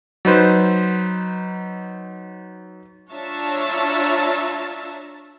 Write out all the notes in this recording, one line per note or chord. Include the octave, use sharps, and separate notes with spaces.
F#3 D#4 B4 C5
D4 F4 C#5 E5 A5 A#5